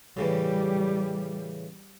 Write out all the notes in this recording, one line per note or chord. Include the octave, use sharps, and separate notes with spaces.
A2 C#3 E3 G3